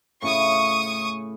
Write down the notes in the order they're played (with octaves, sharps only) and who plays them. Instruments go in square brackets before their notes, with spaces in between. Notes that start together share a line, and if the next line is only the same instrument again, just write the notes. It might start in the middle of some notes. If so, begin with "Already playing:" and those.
[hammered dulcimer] A2 C#3 E4 [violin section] C#6 D#6